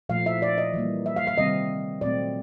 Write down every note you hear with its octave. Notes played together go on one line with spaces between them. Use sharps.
A#2 F3 A3 F5
E5
D5
D#5
E3 G3 A#3
E5
F5
F5
C3 D#3 G3 C4 D#5
A#2 F#3 A3 C4 D5